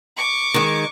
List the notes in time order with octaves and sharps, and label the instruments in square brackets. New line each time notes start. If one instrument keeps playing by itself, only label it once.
[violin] C#6 D6
[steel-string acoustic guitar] D#3 G#3